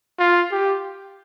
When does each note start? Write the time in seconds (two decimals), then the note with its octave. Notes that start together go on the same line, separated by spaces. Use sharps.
0.19 F4
0.52 G4